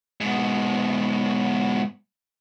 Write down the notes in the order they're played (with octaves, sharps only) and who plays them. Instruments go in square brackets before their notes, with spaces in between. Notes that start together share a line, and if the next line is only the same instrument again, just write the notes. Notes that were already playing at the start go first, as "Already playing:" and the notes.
[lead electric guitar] G#2 B2